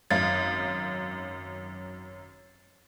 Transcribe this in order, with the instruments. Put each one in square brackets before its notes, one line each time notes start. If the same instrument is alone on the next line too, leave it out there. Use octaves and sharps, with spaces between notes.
[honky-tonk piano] G#1 F#2 F5 [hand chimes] A6